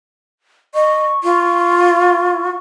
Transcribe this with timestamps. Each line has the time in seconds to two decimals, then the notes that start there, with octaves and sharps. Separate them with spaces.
0.74 D#5 C#6
1.24 F4